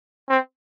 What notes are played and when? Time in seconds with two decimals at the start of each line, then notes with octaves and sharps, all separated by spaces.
0.29 C4